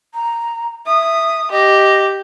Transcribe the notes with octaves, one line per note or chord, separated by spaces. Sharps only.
A#5
E5 D#6
G4 D#5